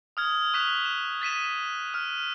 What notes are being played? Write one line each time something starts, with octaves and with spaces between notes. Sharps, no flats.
D#6 F6 G#6
C#6 F#6 B6 E7 F7
E7
A6 B6 D#7 E7
F6